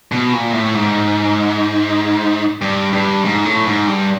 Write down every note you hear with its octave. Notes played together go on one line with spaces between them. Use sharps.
B2
A#2
A2
G#2
G2
G2
G#2
A2
G#2
G2